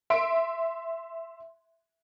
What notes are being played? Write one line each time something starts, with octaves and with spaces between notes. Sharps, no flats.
E5 C6 D7